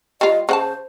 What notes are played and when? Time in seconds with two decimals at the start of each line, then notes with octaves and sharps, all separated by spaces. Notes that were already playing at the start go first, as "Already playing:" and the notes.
0.21 G3 F4 D#5
0.49 C#3 C5 F#5 A5